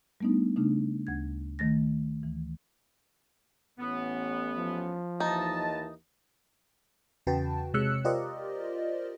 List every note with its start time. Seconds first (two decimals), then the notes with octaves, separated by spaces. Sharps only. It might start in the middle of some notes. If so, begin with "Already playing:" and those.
0.20 G3 A3 B3 D4 D#4
0.56 C#3 A3 D4 D#4
1.07 D2 G#6
1.59 D#3 A3 A6 A#6
2.23 D2 E3
3.79 A1 B3 C#4
4.58 F3
5.20 D#2 D#3 E3 D#4 D#5 A5
7.27 E2 C#3 F#4 B4 G5 A5
7.74 C3 G#3 C#5 E6 F#6 C#7
8.05 F4 G4 A#4 C5 D5 D#5